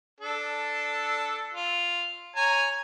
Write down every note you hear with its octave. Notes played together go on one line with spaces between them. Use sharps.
D4 A4
F4
C#5 G#5 A#5